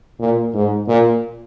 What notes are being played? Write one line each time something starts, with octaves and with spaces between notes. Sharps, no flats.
A#2
G#2
A#2